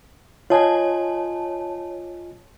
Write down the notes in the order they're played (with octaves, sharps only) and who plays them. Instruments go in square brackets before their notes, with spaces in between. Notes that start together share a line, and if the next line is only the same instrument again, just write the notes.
[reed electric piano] F4 D#5 G#5 [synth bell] C#5 A5